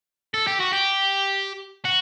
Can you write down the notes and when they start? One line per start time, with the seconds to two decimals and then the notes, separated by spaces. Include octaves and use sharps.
0.34 A4
0.47 G4
0.60 F#4
0.73 G4
1.85 F#4